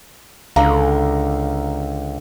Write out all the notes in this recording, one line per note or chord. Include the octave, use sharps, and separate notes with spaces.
C#2 D3 F5 A#5